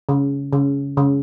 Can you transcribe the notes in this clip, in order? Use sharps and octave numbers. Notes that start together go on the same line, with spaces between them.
C#3
C#3
C#3